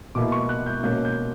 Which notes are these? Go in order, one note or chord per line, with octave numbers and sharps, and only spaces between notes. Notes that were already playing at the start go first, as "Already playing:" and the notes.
B2 A#3 E4 D6
C#6
F#6
G6
B2 A#3 C#4 G6
G6